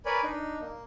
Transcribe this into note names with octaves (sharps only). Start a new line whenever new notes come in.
A#4 B4 C#5 D5 G#5 B5
D4 D#4
A#3